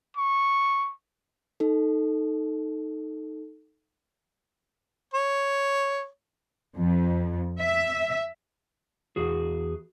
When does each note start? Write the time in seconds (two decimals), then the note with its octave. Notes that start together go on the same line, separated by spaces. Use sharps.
0.17 C#6
1.60 D#4 A4
5.14 C#5
6.76 F2
7.61 E5
9.16 E2 F#4 G#4